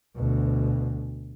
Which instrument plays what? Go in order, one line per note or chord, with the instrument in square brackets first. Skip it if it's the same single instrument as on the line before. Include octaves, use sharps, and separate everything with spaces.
[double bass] D2 B2